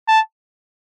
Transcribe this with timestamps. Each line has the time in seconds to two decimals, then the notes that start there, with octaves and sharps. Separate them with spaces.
0.08 A5